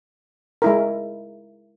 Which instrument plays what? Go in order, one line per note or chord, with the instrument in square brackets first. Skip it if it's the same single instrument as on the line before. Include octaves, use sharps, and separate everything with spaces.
[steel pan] G#3 E4 A#4